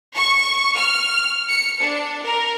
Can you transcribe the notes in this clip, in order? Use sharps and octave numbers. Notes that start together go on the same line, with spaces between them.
C#6
F6
C#7
D4
A#4